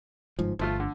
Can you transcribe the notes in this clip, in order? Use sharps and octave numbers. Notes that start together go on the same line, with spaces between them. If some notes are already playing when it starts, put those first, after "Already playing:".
G1 G#2 F3
G1 F3 A3 F4
D3